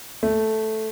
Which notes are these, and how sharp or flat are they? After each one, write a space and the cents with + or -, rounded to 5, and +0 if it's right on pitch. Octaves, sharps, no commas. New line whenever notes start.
A3 -5